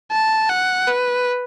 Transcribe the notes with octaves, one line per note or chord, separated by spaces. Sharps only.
A5
F#5
B4